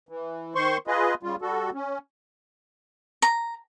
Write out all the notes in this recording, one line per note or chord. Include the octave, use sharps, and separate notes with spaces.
E3
D#3 C5 C6 C#6
F4 G#4 B4 D#5
C#3 G3 F4
G3 F#4 A4
C#4
A#5